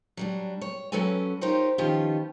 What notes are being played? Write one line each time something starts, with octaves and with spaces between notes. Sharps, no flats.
F#3 G3 D4
C#5
F#3 C#4 F#4 A4 B4 G#5
D#4 F4 G4 A#4 C5 C#5
D#3 F3 B3 C#4 F4 G4